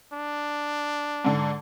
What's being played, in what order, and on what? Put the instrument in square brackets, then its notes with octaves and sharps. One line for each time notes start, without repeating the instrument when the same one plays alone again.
[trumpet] D4
[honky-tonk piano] G#2 D3